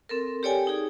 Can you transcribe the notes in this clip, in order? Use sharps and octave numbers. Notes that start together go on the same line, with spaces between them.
C4 A4 A#4
G4 A4 C#5 D5 G5 G#5
D#4 G#4